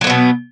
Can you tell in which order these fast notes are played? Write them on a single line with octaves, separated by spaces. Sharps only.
F#3 A#3 B3 B2